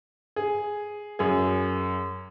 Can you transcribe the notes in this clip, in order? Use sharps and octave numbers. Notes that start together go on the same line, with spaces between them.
G#4
F#2 G#4